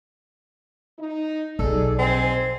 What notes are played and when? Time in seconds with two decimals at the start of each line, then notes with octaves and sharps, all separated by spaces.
0.99 D#4
1.59 B1 D#4 G#4 A4 D5
1.98 A#1 C4 D#5 G#5